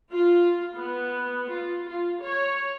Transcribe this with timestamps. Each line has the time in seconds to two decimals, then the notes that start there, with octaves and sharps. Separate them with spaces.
0.10 F4
0.76 B3
1.51 F4
1.90 F4
2.22 C#5